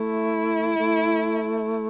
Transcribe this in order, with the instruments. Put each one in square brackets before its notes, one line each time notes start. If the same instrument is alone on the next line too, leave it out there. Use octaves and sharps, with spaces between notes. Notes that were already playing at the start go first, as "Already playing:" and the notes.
Already playing: [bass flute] A3 [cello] E4
[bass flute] A3